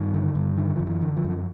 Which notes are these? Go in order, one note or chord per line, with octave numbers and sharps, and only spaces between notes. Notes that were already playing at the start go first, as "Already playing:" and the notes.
Already playing: G2 D#3
D3
G2
D3 D#3
F#2 F3
E3
D3
F3
F#2